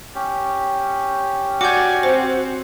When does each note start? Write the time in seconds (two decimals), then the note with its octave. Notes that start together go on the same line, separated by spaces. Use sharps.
0.15 C#4 G4
1.61 F#4 D5 G#5 D6 G6
2.03 C4 C5